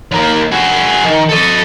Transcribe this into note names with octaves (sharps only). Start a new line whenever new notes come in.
D#2 A#3
F#4 G#4
D#3
A4 D#5